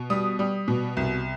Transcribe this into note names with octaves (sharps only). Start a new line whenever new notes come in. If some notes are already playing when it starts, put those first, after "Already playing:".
Already playing: B2
G3 D#6
G3
B2
C2